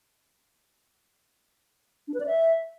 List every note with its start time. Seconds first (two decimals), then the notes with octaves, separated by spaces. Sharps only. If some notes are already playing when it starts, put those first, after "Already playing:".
2.08 D4
2.14 B4
2.20 D5
2.26 E5